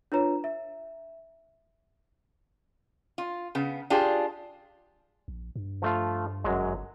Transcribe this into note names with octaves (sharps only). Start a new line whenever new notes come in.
D4 F4 B4 C#5 A#5
E5
F4
C#3 B3
D4 F4 G4 G#4
A#1
G2
F3 A3 F4
G1 F#2 F#3 G#3